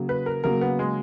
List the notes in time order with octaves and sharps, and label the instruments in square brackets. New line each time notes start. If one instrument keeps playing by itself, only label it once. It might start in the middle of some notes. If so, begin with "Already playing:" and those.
Already playing: [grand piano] C#3 F#3 A#3
[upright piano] B4
A#4
[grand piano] C#3 F#3 A#3 [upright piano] A#4
[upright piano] B3
G#3